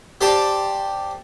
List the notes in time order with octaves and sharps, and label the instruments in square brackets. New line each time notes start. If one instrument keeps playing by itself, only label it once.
[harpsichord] G4 C5 D5 A5